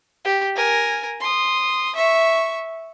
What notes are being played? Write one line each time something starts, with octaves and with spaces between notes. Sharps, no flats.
G4
A#4 G#5
C6 D#6
E5 C#6